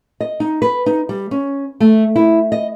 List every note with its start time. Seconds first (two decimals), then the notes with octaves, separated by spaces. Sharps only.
0.21 D#5
0.40 D#4
0.62 B4
0.86 D#4
1.09 G3
1.31 C#4
1.80 A3
2.16 E4
2.52 D#5